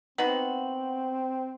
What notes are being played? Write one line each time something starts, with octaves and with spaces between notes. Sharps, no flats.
B3 C4 D#4 F#4 F#5 F#7